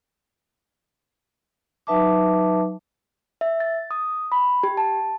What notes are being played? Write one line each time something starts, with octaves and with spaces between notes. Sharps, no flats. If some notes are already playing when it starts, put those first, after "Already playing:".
F#3 D#4 B4 E5 A5 D6
E5
A6
D#6
B5
G4
A5